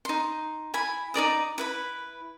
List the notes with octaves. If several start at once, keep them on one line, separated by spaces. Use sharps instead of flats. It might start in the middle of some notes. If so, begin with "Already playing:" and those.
D#4 C6
E4 G#5 B5
D#4 A#4 D5 D#6
E4 B4 B5